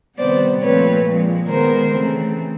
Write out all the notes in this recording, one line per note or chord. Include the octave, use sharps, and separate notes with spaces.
C3 D#3 G3 B3 C5 D5
A#2 F3 A3 C4 B4 C#5
A#2 F3 G#3
D#3 G#3 B3 A#4 C5
C#3 E3 A3 C4